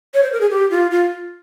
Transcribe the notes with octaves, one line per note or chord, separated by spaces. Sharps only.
C#5
C5
A#4
G#4
G4
F4
F4